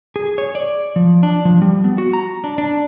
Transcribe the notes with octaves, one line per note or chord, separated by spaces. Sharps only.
G#4
C#5
D5
F3
D4
F3
G3
B3
F#4
A#5
D4
D4